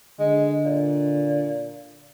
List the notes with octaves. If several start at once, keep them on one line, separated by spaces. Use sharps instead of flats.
D3 G#3
A#2